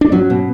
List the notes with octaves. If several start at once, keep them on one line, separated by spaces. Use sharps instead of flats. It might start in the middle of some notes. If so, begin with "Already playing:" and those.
D4
F#3 C#4
B2